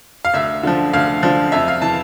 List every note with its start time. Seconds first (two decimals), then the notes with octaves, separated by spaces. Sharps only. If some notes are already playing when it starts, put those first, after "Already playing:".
0.25 F5
0.34 D2 E5
0.63 D3 F3
0.93 D2 F5
1.23 D3 F3
1.52 F2 E5
1.68 F5
1.82 E3 A5